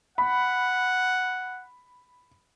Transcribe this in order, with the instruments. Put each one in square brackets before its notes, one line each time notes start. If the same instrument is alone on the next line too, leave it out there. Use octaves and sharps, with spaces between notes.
[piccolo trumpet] F#5 [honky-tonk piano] B5